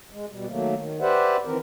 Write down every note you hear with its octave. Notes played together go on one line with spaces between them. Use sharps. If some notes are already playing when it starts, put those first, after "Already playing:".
G#3
B2 G3
D#3 F#3 A3 A#3
D#3
G4 B4 C5 D5 E5 F#5
D#3 E3 C4 A#4